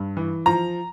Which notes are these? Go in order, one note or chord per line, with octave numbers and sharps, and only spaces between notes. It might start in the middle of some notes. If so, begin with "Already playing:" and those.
Already playing: G2
E3
F3 A#5